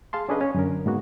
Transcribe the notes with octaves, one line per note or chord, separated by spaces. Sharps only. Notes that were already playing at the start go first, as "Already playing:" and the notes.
G#4 F5 A5 C6
C#4 D4 G#4 A4 B4 D#5
C#4
F#2 D3 A#4
G#2 G#3 A#3 B3 F#4